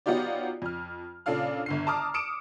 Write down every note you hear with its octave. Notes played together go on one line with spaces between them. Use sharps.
F#3 B3 D#4 F4 G4 D5
F2 F6
A#2 C#3 D4 A4 F5 F6
G1 D3 C7
A5 A#5 D6 D#6 F6
D6 D#6 C#7 D7 E7